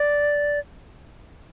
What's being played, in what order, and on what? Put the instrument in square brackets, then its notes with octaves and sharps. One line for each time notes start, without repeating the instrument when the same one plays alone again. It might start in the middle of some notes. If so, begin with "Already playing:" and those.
Already playing: [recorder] D5